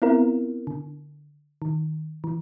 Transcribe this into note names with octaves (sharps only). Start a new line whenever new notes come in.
B3 C4 E4 F4 A#4
D3
D#3
E3